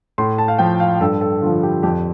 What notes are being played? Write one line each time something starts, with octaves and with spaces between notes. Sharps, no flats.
A2 C6
A5
F5
F3 G5
F5
G2 A4
A4
D3 F3 F4
F4
G4
F2 G4